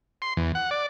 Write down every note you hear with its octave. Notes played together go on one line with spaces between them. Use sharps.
C6
E2
F#5
D5